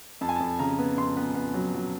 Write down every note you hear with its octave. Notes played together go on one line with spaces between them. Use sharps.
F2 A5
G#5
A5
F2
C#3 A#5
B3
F2 C6
B3
B3
F#3
F#3